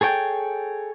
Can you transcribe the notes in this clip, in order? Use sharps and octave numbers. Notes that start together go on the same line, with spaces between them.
G#4 A4 C#5 G5